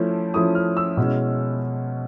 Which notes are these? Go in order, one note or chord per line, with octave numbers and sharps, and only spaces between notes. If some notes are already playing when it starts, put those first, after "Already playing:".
Already playing: F3 A3 C#4 E4
F3 A3 C#4 E4 D#6
F6
E6
B2 G#3 C#4 E4